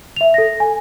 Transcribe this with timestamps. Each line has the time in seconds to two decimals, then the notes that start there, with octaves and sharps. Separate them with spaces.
0.16 E5 F7
0.34 A4 A#6
0.60 G#5